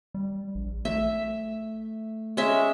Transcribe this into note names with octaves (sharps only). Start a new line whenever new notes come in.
G3
A#1
A3 E5
G#3 C#4 E5